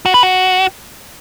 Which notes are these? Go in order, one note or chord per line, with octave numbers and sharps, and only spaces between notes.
F#4
B4
F#4